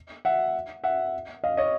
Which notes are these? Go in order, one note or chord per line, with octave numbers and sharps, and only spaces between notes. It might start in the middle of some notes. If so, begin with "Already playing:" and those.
E5 F#5
E5 F#5
D#5 F5
C#5 D#5